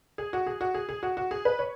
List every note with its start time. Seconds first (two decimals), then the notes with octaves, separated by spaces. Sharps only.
0.18 G#4
0.33 F#4
0.47 G#4
0.61 F#4
0.74 G#4
0.89 G#4
1.03 F#4
1.17 F#4
1.31 G#4
1.45 B4
1.59 C#5